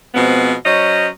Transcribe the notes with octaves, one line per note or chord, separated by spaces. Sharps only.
B2 F3 G#3 B3 C4
F#3 C#4 C5 D#5